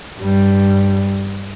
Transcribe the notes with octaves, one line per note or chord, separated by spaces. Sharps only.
G2 G3